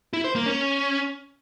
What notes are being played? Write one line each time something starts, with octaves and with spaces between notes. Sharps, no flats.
E4
C5
A#3
C#4